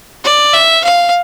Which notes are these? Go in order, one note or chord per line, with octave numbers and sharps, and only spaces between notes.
D5
E5
F5